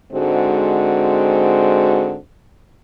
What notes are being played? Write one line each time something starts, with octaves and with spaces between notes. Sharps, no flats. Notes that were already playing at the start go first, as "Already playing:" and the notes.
G#2 D3 G#3 C4 F#4